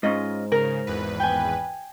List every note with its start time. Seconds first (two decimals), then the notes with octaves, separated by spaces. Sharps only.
0.03 G#2 C#4 F4 D#5
0.52 C#3 A#4
0.87 G#1 E2 B4
1.20 G5 G#5